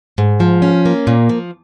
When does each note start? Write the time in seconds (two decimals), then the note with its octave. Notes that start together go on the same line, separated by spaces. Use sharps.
0.18 G#2
0.40 F3
0.62 C#4
0.86 A#3
1.07 A#2
1.29 F3